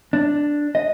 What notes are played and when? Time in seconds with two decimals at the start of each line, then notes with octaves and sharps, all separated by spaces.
0.13 D4
0.75 D#5